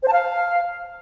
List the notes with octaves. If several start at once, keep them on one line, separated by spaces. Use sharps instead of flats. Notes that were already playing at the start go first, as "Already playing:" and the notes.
C5
A5
F5